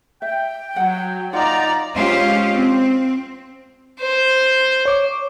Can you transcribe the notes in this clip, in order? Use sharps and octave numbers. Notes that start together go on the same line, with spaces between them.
E5 G5
F#3 F#5
D#4 F4 D5 F#5 A#5
G#3 C#4 F4 G4 C5 F5
C4
C5
C#5 D6